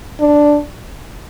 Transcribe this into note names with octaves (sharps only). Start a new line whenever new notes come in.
D4